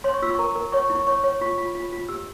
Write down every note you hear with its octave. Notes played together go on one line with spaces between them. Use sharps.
C#5 C6
C#6
F4 E6
C#6
A#4 A#5
A#4
C#5 C#6
C#6
E4
C#6
C#5 C#6
C#5
F4 C#6
F4
F4
F4
G4 E6